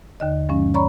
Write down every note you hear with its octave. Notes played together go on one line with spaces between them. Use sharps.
D#2 D3 D#5
G2 F3 G#3 C#4
C#5 D5 A#5 B5 C#6